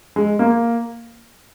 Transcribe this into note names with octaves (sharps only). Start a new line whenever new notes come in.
G#3
A#3